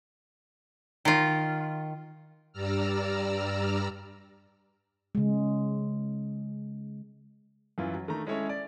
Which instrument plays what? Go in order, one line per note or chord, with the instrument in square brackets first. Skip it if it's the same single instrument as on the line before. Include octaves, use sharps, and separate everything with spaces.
[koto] D#3 F4
[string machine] G2 G3 D5 A#5 E6 F6
[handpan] C#3 G#3
[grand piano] F#2 E3 E4 F4
F#3
D#3 A3 D4 A#5
G#3 C#4 E4 A4 C#5 E5
D5